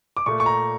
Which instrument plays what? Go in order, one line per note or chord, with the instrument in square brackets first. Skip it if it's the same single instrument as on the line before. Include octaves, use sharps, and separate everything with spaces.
[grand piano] D6
A#2 A3 C#6
C#6
A#5